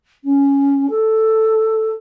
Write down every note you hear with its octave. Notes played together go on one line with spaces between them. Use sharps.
C#4
A4